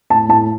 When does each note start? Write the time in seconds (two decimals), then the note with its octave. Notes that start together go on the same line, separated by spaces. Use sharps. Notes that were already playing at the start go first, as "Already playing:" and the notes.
0.10 A2 A5
0.29 A2 A5